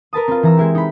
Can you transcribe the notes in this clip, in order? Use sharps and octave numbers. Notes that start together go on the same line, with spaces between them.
A#4 B4 A5 D#6
C4 F4
E3 A#5 E6
G#3 E4 G4
D#4 B5